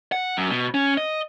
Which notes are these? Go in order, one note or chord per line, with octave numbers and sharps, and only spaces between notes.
F#5
F#2
B2
C#4
D#5